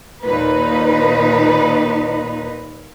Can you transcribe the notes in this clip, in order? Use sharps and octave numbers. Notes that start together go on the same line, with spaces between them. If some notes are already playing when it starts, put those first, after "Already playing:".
D#2 A#2 D#4 B4